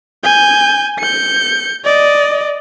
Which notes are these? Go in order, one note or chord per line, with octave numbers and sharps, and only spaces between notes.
G#5 G6
G6 C#7
D5 D#5